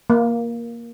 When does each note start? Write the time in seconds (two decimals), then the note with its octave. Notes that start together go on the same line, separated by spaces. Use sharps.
0.10 A#3